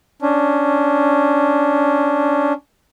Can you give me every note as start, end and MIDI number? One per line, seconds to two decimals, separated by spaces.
0.22 2.53 61
0.22 2.53 62